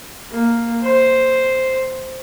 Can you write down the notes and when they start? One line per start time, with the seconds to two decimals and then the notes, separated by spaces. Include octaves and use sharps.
0.31 A#3
0.83 C5